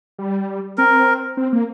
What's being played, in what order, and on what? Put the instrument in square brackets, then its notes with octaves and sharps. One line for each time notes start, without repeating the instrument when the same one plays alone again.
[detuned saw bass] G3
[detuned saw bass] C4 [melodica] A#4
[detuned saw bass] C4
A#3